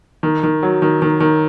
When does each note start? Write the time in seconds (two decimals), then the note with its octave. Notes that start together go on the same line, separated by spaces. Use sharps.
0.23 D#3
0.43 D#3
0.63 F#3
0.82 D#3
1.02 D#3
1.21 D#3